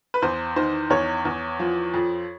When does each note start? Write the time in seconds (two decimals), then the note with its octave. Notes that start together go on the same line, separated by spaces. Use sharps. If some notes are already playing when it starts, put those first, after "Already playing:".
0.14 B4
0.22 E2 C5
0.56 D#3 C5
0.90 E2 C#5
1.25 E2
1.60 F3
1.94 F2